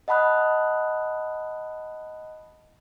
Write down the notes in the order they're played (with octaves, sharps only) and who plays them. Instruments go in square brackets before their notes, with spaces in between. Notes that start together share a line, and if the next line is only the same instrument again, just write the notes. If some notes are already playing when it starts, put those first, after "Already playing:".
[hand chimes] D#5 F#5 A5 B5 D#6 F#6